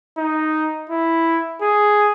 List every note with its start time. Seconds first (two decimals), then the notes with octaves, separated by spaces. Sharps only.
0.17 D#4
0.89 E4
1.61 G#4